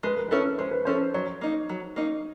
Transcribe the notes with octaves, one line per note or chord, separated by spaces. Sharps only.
G#3 B4
A#4
C#4 E4 A4 B4
G#3 C5
B4
C#4 E4 A4 C5
F#3 C#5
A#3 D#4
F#3
A#3 D#4